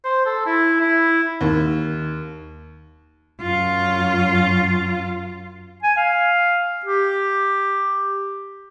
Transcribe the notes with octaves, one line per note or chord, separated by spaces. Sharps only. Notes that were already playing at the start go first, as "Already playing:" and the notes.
C5
A4
E4
E4
D#2
F#2 F4
G#5
F5
G4